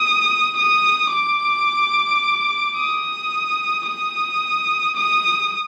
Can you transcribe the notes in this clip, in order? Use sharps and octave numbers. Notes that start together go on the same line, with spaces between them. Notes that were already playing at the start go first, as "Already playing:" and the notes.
Already playing: D#6
D#6
D6
D#6
D#6
D#6